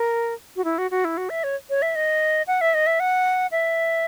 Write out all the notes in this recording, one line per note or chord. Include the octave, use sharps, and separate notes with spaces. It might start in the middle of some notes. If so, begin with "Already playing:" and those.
Already playing: A#4
F#4
E4
F#4
F#4
E4
F#4
E5
C#5
C#5
E5
D#5
F#5
E5
D#5
E5
F#5
E5